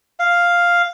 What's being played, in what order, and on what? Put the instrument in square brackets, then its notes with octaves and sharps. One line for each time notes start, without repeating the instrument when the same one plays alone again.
[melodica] F5